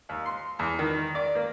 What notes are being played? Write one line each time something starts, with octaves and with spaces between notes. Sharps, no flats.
D#2
C6
E2
D#3
D5
A#3